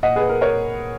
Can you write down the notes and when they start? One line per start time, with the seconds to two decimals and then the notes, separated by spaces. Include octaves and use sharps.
0.03 A#2 D#5 F#5
0.16 G#4 B4
0.29 A#4
0.41 A#4 C#5